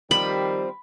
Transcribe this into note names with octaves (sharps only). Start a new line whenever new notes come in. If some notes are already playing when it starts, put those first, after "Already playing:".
D#3 F3 G3 C4 G4 B5